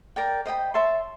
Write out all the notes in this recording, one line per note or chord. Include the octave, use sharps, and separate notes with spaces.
A#4 D5 G5
C5 D#5 G5 B5
C#5 E5 A5 C6